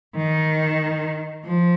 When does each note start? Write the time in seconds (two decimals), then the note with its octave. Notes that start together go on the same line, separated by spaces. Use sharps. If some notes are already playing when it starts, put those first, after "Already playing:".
0.17 D#3
1.45 F3